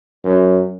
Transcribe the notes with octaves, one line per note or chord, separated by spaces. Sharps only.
F#2